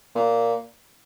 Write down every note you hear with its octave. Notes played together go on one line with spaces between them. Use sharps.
A#2